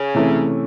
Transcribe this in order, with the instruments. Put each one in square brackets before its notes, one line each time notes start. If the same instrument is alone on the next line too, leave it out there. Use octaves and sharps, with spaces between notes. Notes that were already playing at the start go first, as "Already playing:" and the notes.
Already playing: [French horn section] C#3
[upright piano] C3 E3 A3 C#4